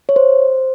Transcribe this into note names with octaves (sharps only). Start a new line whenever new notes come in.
C#5
C5